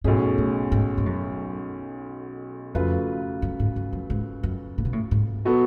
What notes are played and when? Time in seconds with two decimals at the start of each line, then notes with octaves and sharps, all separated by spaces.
0.04 B1 G#2 B2 A3 C#4 G#4
0.38 A2
0.72 G#2
0.98 G#2
1.06 F#2
2.75 F2 C#3 F#3 A3 F4 B4
3.42 F#2
3.59 G#2
3.76 F#2
3.93 F#2
4.10 G#2
4.43 F#2
4.78 A2
4.85 B2
4.93 A2
5.11 G#2
5.45 B2 F#3 B3 F#4 A4